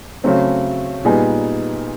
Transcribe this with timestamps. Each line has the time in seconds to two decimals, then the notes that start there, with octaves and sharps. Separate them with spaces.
0.24 C#3 F#3 A3 C4
1.05 A#2 G3 B3 D#4 G#4